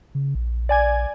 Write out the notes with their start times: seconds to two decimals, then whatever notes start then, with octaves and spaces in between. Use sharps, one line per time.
0.15 C#3
0.35 A#1
0.69 D5 G#5 G#6